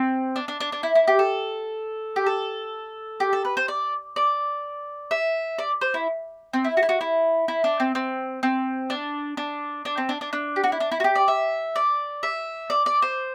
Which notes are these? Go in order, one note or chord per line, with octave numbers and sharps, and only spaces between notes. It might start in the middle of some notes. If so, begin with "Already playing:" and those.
Already playing: C4
D4
D4
D4
D4
E4
E4
G4
A4
G4
A4
G4
A4
B4
C5
D5
D5
E5
D5
C5
E4
C4
E4
F#4
E4
F#4
E4
E4
D4
C4
C4
C4
D4
D4
D4
C4
D4
D4
D4
G4
F#4
E4
D4
E4
F#4
G4
D5
E5
D5
E5
D5
D5
C5